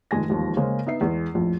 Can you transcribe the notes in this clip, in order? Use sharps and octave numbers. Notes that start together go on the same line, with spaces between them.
F1 F2 D#3 G#3 G#5 A#6
E1 D#2 F3
C#3 G#3 A#3 C5
B3 D#4 E5 C7
E2 G#3
A#1 F2 A2